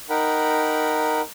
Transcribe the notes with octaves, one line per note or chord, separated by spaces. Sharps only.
D#4 A#4 F#5 G5 B5